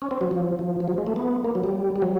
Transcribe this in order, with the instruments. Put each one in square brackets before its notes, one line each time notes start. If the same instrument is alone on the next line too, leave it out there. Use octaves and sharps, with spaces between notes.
[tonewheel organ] C#4
C4
F#3
F3
F3
F3
F#3
G#3
A3
B3
A#3
F#3
G3
G3
F#3